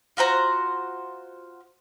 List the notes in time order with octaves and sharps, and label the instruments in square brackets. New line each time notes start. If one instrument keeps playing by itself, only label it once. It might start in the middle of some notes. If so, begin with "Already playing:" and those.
[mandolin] F4 F#4 C5 A#5